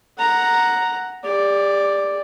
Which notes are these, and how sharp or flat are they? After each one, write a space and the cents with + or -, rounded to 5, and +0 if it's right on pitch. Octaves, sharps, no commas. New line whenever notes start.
F#5 +0 A#5 +0
G4 +40 D5 +0